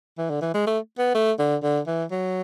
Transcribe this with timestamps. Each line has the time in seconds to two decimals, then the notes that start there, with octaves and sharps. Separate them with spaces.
0.18 E3
0.30 D3
0.41 E3
0.54 G#3
0.67 A3
0.98 B3
1.14 A3
1.39 D3
1.63 D3
1.87 E3
2.11 F#3